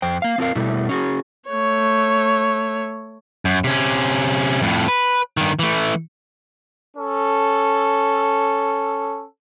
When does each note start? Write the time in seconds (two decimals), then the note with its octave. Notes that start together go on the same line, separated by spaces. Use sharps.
0.02 F2 C5 G5
0.22 A#3 F5
0.38 C4 F4 A#4 F5
0.55 B2 G3 A3 E4
0.89 C#4 F#4 G#4
1.49 A3 C#5
3.45 F#2
3.64 C3 C#4
4.62 F2 A2
4.88 B4
5.37 G2 D#3
5.59 E3 A3
6.95 C#4 A4